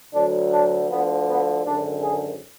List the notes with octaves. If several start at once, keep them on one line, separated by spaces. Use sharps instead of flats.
D2 D3 F#3 D4
D4
D2 D3 F3 B3
B3
G#1 F#2 D3 D4
G#4